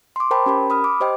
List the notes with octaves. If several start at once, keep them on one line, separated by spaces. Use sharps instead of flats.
C6 D6
A#4 C5 G5 A5 B5
C#4 G4 A#4 B5
B5 D#6 F6
D6
G4 C5 D#5 G5